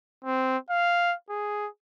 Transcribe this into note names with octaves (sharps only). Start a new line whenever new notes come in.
C4
F5
G#4